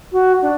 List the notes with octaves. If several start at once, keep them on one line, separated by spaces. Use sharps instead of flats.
F#4
D4